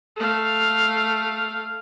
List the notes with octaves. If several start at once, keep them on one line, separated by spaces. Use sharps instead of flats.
A3 F5